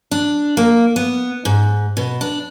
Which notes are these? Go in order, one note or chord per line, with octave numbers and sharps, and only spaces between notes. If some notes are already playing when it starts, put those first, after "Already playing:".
D4
A#3
B3
G#2
B2
D4